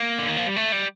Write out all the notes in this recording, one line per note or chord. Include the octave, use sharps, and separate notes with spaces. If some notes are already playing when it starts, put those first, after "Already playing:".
Already playing: A#3
D3
D#3
F3
G3
A3
G3